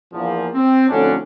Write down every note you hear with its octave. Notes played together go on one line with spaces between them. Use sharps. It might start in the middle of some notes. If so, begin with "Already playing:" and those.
A#1 E2 A#2 F3
C4
F2 A2 D3 F#3 C#4 D4